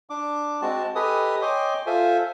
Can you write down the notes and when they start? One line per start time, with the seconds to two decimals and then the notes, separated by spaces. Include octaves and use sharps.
0.10 D4 D6
0.62 G#3 C4 F#4 A5
0.95 G4 A4 B4 D#5 G#5 D#6
1.42 C#5 D#5 G5 G#5 C6 D6
1.86 F4 A4 C5 E5 G#5